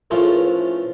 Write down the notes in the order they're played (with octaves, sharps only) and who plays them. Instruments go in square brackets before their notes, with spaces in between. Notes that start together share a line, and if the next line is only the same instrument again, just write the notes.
[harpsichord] A2 F3 A3 C#4 F4 [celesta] A#4
[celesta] G#4
A#4
B4
C5